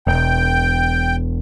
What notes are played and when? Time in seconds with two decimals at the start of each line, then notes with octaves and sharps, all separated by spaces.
0.07 E1 G5